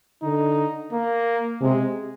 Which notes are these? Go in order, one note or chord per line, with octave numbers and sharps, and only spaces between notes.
D3 D#4
A#3
C3 G#3